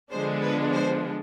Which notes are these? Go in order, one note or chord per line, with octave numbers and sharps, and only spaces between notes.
D3 F3 G#3 B3 D4 C5
B4
C5